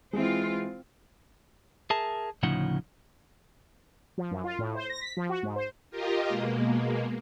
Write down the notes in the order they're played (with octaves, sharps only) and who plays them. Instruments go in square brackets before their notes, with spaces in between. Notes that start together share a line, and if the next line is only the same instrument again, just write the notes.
[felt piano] E3 G#3 [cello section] C4 F4
[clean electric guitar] G#4 A#4 E5 A5
D2 A2 C#3 F3 D#4 F#5
[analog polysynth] F3
F#2
F4
A2
C5
A#6
B6
F3
F#4
G#2
C5
[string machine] F4 G4 A#4 D#5
B2 G#3 A#3